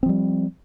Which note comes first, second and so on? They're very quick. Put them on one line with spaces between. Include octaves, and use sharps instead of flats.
C4 F3 G3